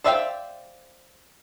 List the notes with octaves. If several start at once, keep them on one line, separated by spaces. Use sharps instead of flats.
C5 D5 E5 F5 G5